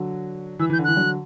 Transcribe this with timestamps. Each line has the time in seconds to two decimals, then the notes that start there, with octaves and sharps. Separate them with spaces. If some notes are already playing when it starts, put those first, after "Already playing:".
Already playing: D3 F#3
0.59 E3 E6
0.70 E3 G6
0.79 D3
0.84 E3 F#6
0.96 D3 F#3